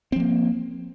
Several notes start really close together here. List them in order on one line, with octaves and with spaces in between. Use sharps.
C4 F3 A#3